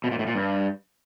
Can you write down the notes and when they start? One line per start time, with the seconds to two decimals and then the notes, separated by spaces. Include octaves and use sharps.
0.04 B2
0.12 A#2
0.19 A2
0.27 A#2
0.35 G2